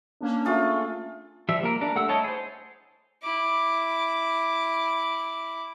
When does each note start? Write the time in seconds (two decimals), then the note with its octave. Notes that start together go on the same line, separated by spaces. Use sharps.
0.21 A#3 C#4 D4
0.45 A3 F4 G#4
1.49 F3 G3 E5
1.63 A#3 A#4
1.81 G3 D4 A#4
1.96 A3 F#5 E6
2.09 E4 C#5 D#5 A5
2.24 G#4 C5
3.23 E4 D6